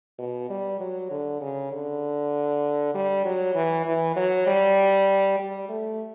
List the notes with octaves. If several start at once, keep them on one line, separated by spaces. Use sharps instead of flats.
B2
G3
F#3
D3
C#3
D3
G3
F#3
E3
E3
F#3
G3
G3
A3